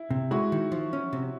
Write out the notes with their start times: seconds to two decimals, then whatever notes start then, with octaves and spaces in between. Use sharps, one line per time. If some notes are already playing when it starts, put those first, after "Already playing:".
Already playing: E4
0.11 C3
0.31 G#3 E4 F#4
0.52 D#3
0.72 F3
0.93 C#4
1.13 C3